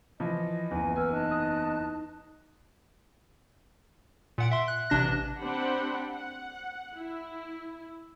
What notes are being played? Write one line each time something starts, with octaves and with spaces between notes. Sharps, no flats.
E3 F3 D#5
F#1 E2 E3 G#5
B4 G#5 E6 F6
D#4 D#5 A5 F#6
D#6
A#2 F#5 D7
E5 C6
F#6
A1 C3 D4 F#6 A#6
C4 D4 G4 C5 F#5 B5
F#5
E4